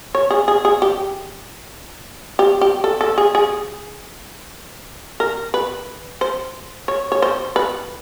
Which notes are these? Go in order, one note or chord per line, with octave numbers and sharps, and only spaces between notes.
C#5
G#4
G#4
G#4
G4
G4
G4
A4
A4
G#4
G#4
A#4
B4
C5
C#5
C#5
C5
B4